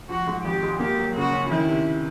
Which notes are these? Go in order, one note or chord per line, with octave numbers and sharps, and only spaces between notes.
F3 F#4
G#2
G#1 G4
G#3
A#3 G4
F#3
C#3 F#4
C#4
D#3 E4
C3